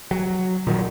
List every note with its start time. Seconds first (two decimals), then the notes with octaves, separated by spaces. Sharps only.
0.11 F#3
0.67 A#2 D#3 F#3